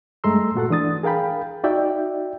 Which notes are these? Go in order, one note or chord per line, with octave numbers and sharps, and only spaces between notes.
G2 G#3 A3 A#5 C6 E6
A#2 F#4 A4 F#5
E3 D4 D#6 A6
G#4 A#4 F5 G5 B5
D#4 F#4 D5 E5 G5